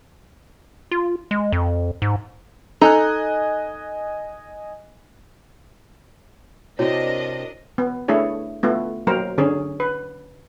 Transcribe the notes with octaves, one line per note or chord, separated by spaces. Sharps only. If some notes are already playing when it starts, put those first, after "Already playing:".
F4
G#3
F2
G#2
D#4 A4 D#5 G#5 A#5 F#6
C3 C4 D4 E4 F#4 A#4 C#5 D#5
B3
A3 D4 E4 G#4 C#5
A3 B3 F4
F#3 A#3 A#4 C5
D3 C#4 G#4
B4